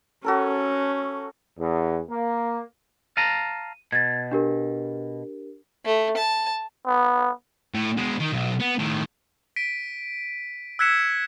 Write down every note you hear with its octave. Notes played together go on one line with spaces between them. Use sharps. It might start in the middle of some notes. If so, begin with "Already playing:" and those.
C#4 F#4 A4 A#4
E2
A#3
F5 A5 A#5 D#7
B2 G#6 A6
D4 G4 A#4
A3
A5
B3
A2
B2 G#3
D#3
B1
B3
A2 D#3
B6 D7 D#7
E6 F#6 G#6 B6 C#7 E7